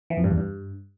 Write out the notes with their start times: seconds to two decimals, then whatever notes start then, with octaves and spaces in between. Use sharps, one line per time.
0.10 E3
0.17 F2
0.24 G2
0.31 E2
0.38 G2